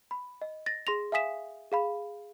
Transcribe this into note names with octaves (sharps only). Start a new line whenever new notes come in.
B5
D#5
A6 A#6
G#4 C6 A#6 F7
E5 F5 G#5 D#6 B6 E7
G#4 F5 B5